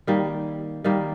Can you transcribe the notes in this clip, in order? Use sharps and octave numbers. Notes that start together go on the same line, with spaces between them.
D#3 G3 A#3
D#3 G3 A#3